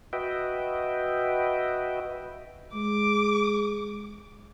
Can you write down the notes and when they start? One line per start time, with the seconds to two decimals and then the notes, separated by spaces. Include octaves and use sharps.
0.13 F#4 B4 D#5 E5 G5
2.74 G#3 D6